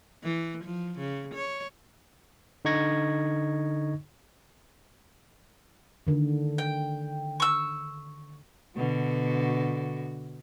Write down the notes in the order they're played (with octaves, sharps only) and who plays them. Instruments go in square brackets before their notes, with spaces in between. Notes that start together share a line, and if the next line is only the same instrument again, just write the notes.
[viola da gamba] E3
F3
C#3
C#5
[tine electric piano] D3 D#4 D#5 C#6 G#6 A#6
[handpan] D3 D#3
[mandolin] G5
C#6 E6
[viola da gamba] B2 D3 F#4